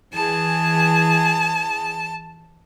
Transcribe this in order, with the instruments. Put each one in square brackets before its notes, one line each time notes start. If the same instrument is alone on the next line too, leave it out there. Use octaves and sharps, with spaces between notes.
[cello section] E3 G#4 [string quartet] A5